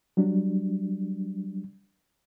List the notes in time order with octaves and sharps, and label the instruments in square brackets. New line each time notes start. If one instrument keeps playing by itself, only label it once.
[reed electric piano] F#3 G3 D4